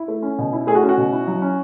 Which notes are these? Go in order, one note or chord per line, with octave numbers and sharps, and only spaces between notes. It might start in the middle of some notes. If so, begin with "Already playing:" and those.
Already playing: E4
A3
C#4
B2
E4
A3 G#4
F#4
C#4
F#4
B2
E4
F#3
C#4